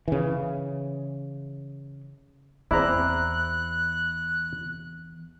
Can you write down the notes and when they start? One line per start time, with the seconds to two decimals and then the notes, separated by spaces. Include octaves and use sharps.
0.08 C#3 E3
2.71 E2 C4 E4 G#4 D5 A#5 F#6